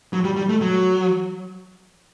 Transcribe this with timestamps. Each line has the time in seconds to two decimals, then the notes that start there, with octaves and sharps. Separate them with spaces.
0.13 F#3
0.24 G3
0.37 G3
0.49 A3
0.61 F#3